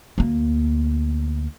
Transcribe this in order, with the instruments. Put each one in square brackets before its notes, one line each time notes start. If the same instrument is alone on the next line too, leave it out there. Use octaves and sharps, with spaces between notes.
[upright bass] D2 A#3